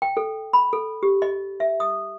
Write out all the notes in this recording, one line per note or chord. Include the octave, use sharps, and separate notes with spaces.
G5
A4
B5
A4
G4
D#5
E5
D#6